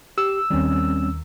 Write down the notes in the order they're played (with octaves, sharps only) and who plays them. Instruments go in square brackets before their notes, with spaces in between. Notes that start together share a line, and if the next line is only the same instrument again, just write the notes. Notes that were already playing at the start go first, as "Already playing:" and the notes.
[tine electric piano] G4 [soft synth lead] E6
[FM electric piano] D#2 D#3 [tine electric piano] G3 C4 C#4